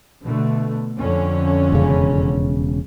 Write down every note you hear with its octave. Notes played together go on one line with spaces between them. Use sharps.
B2 D3 A3
F2 D3 C#4
E1 C#3